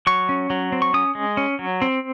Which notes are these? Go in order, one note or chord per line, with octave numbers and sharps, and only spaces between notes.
F#3 C#6
C#4
F#3
C4
C#6
C#4 D#6
G#3
C#4
F#3
C4